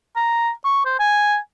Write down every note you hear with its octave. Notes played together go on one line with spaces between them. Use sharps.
A#5
C#6
C5
G#5